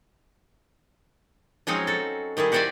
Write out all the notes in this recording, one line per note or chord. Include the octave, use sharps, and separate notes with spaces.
F3 F#3 G#3 C4 C#4 D#4
F#4 A4
D#3 G3 E4 G#4
F#4 G4 C5 D5 E5 G#5